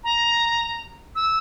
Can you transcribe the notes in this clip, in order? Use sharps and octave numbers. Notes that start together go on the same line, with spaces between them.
A#5
E6